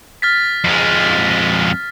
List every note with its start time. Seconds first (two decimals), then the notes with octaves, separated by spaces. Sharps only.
0.22 F6 A6 B6
0.64 F2 G#3